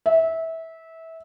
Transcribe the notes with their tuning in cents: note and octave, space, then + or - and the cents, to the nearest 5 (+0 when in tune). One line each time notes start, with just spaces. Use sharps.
E5 -20